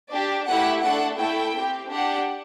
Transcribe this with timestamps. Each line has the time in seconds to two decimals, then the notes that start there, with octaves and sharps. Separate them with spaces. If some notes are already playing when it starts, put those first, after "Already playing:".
0.12 D4 G4 D5
0.47 A3 E4 G4 F#5
0.84 A3 D4 A4 F#5
1.19 A3 E4 A4 G5
1.55 C4 G4
1.90 D4 G4 F#5